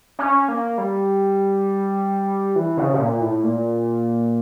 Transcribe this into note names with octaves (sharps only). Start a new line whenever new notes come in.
C#4
A#3
G3
E3
C#3
C#3
A#2
A2
A#2